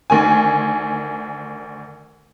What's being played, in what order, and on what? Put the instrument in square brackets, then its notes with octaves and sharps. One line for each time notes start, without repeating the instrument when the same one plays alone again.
[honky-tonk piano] D2 D#3 G#5